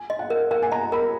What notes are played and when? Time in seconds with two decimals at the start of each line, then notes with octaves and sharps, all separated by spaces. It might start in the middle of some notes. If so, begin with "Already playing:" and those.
Already playing: G#5
0.10 D#5
0.19 F#5
0.30 A#4
0.51 A#4 F#5
0.62 G#5
0.72 D#5 A#5
0.92 A#4 B5